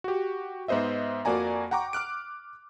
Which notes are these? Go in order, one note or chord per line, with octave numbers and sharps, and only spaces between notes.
F#4 G4
G#2 B3 C5 D#5 E5
F2 A#3 F#4 D5 G#5 A#5
F#5 G5 A#5 C#6 D6
D6 F6 F#6 D7